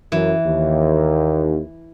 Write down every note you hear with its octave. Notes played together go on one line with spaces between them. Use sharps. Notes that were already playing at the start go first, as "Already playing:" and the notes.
F#2 E3
D#2